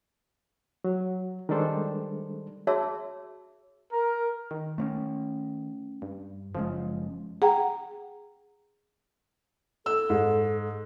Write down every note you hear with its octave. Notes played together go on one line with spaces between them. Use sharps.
F#3
D#3 G3 G#3 D4 A4 C5
F#4 G#4 C#5 E5 A5 E6
A#4
D#3
A3 C4 C#4
G2
F#1 C#3 F3 G#3
G#4 F#5 G5 A#5
A4 E6
G#2